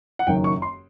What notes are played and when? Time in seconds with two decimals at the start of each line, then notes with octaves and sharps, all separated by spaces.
0.19 F#5
0.27 F#1 F#2 D#3 F#3 G5
0.44 C#6
0.62 C6